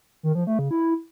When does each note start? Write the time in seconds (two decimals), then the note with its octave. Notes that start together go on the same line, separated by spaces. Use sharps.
0.23 D#3
0.35 F3
0.47 A3
0.59 C#3
0.71 E4